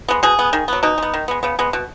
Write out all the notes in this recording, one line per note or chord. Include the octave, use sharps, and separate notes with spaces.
G#3 B3
B2 G#4
B3
D#3
F#3 B3
B2 D#4
G#3
B3
D#3
G#3 B3
C#3 B3
G#3 B3
B2